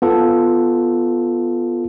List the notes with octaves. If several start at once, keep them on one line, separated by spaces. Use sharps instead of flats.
B3 F4 A4